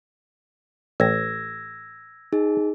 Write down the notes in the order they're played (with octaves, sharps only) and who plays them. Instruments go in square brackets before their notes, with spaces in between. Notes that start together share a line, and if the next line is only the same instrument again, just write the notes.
[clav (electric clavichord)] A1 [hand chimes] E6 G#6 A#6
[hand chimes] D#4 G#4